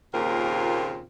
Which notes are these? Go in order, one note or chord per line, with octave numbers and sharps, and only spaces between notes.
D#2 A#2 C#3 C4 F4 A#4